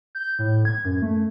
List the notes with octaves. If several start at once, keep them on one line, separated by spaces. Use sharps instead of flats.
G6
A2
G#6
F#2
A3